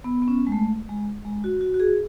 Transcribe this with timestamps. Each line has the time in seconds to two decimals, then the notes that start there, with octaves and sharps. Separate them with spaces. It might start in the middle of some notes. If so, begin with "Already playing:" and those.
0.04 B3
0.22 B3
0.28 C#4
0.47 G#3
0.52 A3
0.89 G#3
1.25 G#3
1.44 F#4
1.61 F#4
1.74 F#4
1.80 G#4